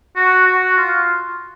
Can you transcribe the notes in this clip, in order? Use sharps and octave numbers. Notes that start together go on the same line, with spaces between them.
F#4
F#4
F4